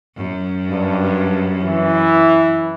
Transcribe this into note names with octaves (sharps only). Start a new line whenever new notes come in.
F#2
G2
E3